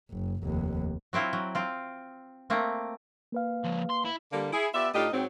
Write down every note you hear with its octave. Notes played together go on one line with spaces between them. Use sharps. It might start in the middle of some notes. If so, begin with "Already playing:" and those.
F#1
F1 D#2
F#3 C4 E4 F4
F#3
C4 F4
A3 A#3 C4
A#3 B4 F5
F3 G#3
C6
E4
D3 G3 A#3
E4 G#4
B3 F4 G4 D5 E5
A2 D4 D#4 F4 G4 D#5
G#2 F#3 C4